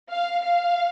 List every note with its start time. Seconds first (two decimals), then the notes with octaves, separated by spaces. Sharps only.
0.12 F5
0.42 F5